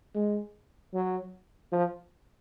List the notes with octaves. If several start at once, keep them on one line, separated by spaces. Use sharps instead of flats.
G#3
F#3
F3